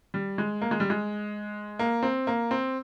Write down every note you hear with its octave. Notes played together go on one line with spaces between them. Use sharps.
G3
G#3
A#3
G#3
G3
G#3
A#3
C4
A#3
C4